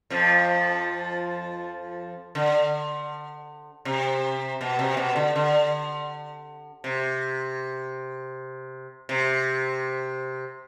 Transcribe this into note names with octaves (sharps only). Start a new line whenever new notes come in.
F2 F3
D3
C3
B2
C3
B2
D3
D3
C3
C3